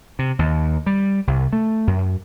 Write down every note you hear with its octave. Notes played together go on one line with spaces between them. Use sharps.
C3
D#2
G3
C2
A3
F#2